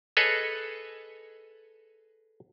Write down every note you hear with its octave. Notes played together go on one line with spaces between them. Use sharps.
G#4 A4 B4 C#5 D#5 G#5